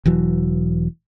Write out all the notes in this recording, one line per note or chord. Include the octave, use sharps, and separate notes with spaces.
E1 E3 F#3